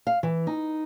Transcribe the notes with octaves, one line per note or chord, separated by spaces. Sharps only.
F5
E3
D#4